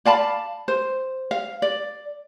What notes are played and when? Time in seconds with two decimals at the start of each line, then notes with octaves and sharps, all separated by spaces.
0.06 D5 F5 A5 B5
0.68 C5
1.31 F5
1.62 D5